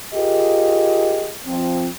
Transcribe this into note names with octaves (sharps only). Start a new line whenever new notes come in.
F4 G4 G#4 A#4 D#5
F2 F3 C4